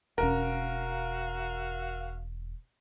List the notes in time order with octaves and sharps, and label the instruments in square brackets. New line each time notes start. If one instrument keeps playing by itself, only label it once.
[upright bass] E1 C#4 [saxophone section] F#4 F5 [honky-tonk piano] A#4